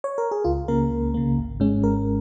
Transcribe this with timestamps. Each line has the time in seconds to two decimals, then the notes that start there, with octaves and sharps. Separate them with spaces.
0.04 C#5
0.18 A#4
0.31 G#4
0.44 C#2 F4
0.68 C#3 A#3 A#4
0.91 C#2
1.14 C#3 A#3
1.38 G#1
1.60 G#2 G#3 C#4
1.84 G#1 A#4